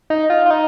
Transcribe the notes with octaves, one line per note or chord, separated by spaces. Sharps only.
D#4
F4
F4
D#4